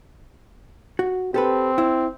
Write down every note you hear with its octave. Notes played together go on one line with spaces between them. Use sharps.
F#4
C4 G4 A4 B4
E4